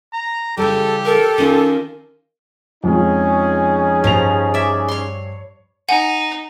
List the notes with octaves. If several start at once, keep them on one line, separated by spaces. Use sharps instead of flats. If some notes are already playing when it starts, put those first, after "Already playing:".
A#5
C#3 E3 G3 G4 A4
A4 A#4
D#3 C#4 F4
F2 F3 G#3 C#4 D#4 G#4
G2 F3 G3 F7
D5 E5
C#5 C6
D#4 F#5 G#5